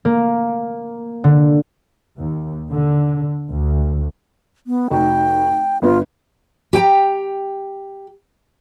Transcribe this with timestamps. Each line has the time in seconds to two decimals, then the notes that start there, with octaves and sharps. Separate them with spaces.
0.05 A#3
1.24 D3
2.17 D#2
2.70 D3
3.50 D2
4.67 B3
4.90 F1 D#4 F#4 G5
5.82 G1 B3 F4
6.73 G4 G5 G#5 A#5